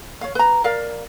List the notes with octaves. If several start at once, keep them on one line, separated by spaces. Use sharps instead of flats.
C#5 F5
B4 A#5
A#4 D5 F5